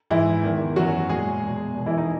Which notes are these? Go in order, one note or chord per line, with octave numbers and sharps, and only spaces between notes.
G#2 E3 E4
E2 D#3
F#2 E3 F#3 F#4
A#2 G#3 G#4
E2 B2
E2 B2
E3 E4
D#4